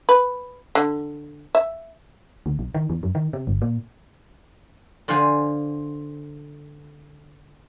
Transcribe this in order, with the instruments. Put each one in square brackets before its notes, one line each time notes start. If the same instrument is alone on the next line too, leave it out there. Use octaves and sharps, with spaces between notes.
[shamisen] B4
D3
E5
[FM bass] D2
B1
D#3
E2
F#2
D#3
C3
G1
A#2
[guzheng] D3 F4 C5 F#5 G#5